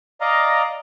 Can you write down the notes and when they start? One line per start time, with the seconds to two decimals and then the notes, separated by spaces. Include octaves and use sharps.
0.21 D5 D#5 F5 A#5